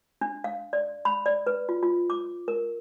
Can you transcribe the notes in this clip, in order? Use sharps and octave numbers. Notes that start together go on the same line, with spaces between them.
D4
F5
D5
B5
D5
B4
F4
F4
D6
A#4